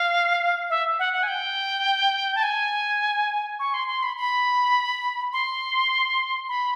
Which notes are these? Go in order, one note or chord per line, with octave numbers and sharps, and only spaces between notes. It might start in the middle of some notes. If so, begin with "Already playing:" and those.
Already playing: F5
E5
F#5
F#5
G#5
G5
A5
G#5
C#6
C6
C6
B5
B5
C6
B5